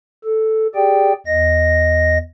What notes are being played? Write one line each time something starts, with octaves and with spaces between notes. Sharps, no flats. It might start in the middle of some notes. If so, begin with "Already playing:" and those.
A4
G4 G#4 D5 G5
E2 D#5 A#6